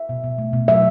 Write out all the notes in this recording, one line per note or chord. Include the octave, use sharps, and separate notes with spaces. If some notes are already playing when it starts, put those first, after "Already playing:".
Already playing: E5
B2
B2
A3
B2
F#3 E5